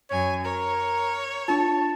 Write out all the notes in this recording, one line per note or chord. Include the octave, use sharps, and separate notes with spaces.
F#2 C#5 G#5
A#4 C#5
D4 F4 A5